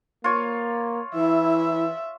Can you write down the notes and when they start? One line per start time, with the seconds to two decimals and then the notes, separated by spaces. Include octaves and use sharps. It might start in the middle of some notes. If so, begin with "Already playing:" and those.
0.24 A#3 F4 C#5
1.15 E3 E4 E5